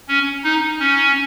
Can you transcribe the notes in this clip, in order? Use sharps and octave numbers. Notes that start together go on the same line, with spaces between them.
C#4
D#4
C#4